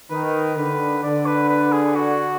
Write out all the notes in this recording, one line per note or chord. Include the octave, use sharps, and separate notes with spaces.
D#3 B4
D3 B4
D3 D5
B4
B4
G#4
F#4